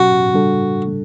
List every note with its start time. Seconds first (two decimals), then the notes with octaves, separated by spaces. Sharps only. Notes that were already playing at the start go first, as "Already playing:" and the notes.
Already playing: B2 F#3 C#4 F#4 G4
0.34 C#3 G3 D4 A4